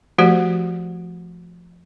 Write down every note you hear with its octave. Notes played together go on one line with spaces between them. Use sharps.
F3 A3 F#4 G4 C5